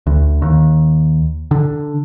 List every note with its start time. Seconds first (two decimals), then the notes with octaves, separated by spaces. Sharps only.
0.07 D2
0.42 D#2
1.51 D3